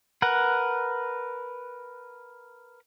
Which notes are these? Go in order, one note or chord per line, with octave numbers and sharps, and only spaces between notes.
A#4 B4 F#5